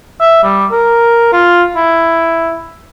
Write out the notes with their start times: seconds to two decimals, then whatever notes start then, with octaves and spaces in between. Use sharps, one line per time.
0.20 E5
0.43 G3
0.71 A#4
1.33 F4
1.76 E4